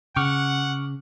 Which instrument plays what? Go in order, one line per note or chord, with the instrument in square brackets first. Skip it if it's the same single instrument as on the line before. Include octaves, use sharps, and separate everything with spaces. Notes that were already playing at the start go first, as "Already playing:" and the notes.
[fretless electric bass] C#3 [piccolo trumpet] F#5 [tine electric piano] C#6 D6 F6